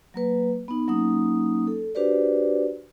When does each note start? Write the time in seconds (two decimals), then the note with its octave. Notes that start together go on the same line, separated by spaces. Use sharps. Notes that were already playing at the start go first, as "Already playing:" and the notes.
0.14 F#3 A#3 B4
0.68 B3 D#4
0.88 F#3 A#3 C#4 D#4 D#6
1.67 A4
1.95 D4 F#4 G4 B4 C5 D5